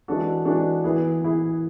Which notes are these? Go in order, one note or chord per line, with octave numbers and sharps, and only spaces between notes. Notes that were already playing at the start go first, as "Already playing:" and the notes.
E3 G#3 D4 F#4 A4
E3 G#3 D4 F#4 A4
E3 B3 E4 G#4
E3 B3 E4 G#4